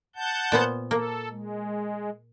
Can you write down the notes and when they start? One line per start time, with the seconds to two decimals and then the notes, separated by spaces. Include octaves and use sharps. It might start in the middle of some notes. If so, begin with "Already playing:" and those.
0.16 F#5 A5 G6
0.52 A#2 B3 C5
0.91 A#3 A4
1.30 G#3